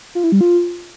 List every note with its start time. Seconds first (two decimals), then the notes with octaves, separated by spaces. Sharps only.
0.15 F4
0.24 E4
0.32 G3
0.41 F4